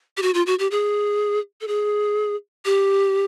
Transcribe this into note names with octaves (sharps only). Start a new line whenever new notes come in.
G4
F#4
F4
F#4
G4
G#4
A4
G#4
G4